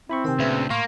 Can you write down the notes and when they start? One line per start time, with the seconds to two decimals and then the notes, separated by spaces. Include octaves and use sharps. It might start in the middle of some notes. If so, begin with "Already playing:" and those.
0.10 C4 E4 B5 C#6
0.24 C3 D#3 C5 G5 G#5
0.39 D2 A#2 C#3 B4 E5
0.70 A2 A#3 F5 C6 C#6